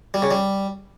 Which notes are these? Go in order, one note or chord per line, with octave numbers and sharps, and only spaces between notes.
G3
C#3
G3